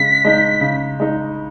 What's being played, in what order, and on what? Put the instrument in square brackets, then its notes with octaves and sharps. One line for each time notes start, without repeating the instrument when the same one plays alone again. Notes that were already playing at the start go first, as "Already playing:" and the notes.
Already playing: [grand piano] C#3 G#3 [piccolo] B6
[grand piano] G#3 D#4
C#3
G#3 D#4